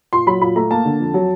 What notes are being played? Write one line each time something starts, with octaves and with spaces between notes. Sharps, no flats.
A#2 C6
F#3 B5
A#2 B5
A3 A#5
A#3 A5
D3
F2
F#3